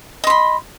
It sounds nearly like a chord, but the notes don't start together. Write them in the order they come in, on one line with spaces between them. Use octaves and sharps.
D#5 C6 B5